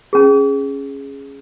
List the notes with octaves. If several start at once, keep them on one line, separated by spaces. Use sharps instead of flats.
C#4 G#4